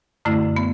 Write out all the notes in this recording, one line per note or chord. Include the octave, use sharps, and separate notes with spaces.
F#2 D3 A3 E4
B3